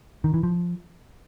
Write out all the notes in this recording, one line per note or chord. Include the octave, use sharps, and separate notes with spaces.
D#3
E3
F3